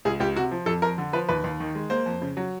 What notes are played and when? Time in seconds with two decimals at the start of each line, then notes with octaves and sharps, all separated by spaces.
0.05 C#2 G#4
0.20 C#2 G4
0.36 C3 F#4
0.51 F3
0.66 F2 A4
0.82 F2 A#4
0.98 D3
1.13 F3 B4
1.29 D#2 B4
1.44 D#2
1.60 D#3
1.75 G#3
1.90 A#3 C5
2.06 F2
2.22 C#3
2.37 F#3